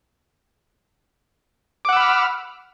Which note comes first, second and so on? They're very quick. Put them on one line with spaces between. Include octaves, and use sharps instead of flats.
D6 F#5 E6 B5 F6